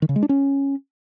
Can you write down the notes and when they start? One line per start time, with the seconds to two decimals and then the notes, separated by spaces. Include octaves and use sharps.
0.02 D#3
0.09 C#3
0.16 G#3
0.23 D4
0.29 C#4